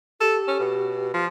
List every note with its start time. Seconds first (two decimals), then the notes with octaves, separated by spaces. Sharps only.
0.21 G4 A4
0.48 C#4
0.59 B2
1.14 F3